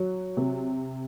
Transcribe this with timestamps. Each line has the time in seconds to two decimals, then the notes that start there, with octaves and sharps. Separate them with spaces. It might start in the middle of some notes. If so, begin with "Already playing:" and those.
Already playing: F#3
0.37 C3